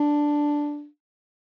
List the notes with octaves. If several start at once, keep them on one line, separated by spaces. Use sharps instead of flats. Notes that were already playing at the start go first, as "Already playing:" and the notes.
Already playing: D4